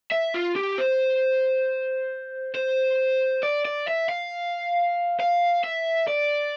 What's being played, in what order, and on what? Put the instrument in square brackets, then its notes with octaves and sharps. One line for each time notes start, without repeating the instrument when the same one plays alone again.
[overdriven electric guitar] E5
F4
G4
C5
C5
D5
D5
E5
F5
F5
E5
D5